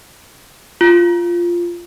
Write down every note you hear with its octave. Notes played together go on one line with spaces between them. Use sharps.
F4